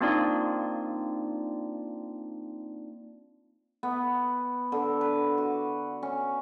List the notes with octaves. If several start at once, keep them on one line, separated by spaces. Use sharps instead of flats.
A#3 C4 D4 D#4 F4 D5
B3
D3
B4
F#4
C#4